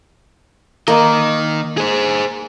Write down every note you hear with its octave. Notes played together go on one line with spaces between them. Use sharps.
D#3 A#3 D#5
G#4 C5